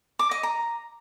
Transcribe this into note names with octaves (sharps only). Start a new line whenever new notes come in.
D6
D#5
A#5